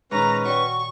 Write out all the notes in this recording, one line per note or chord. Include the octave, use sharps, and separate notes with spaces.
A#2 D#3 G#3 C#4 D#4 B4 A#5
F#4 C#5 D5 G5 C#6